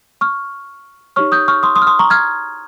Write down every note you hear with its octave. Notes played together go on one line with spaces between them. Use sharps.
C#6 F6
D#4 G4 C#5 C#6 F6
D#6 G6
C#6 F6
C6 D#6
C6 D#6
F6
C6 D#6
A#5 C#6
F6 G#6